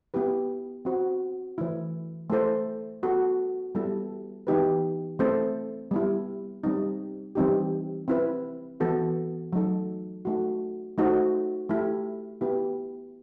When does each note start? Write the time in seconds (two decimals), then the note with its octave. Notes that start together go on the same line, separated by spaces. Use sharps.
0.14 B3 E4 G4 B4
0.85 C4 F#4 C5
1.58 E3 A3 E4
2.30 A3 E4 A4 C5
3.03 B3 F#4 A4
3.75 G3 B3 E4 A4
4.47 E3 B3 D#4 G4 B4
5.19 A3 C4 E4 A4 C5
5.91 G3 B3 E4
6.64 G3 C4 D#4
7.35 E3 G3 C4 D#4 G4
8.08 C4 E4 B4
8.80 E3 B3 F#4 A4
9.53 F#3 A3 D#4 A4
10.25 A3 D#4 F#4
10.98 A3 D#4 F#4 C5
11.69 A3 E4 G4
12.41 B3 E4 G4 B4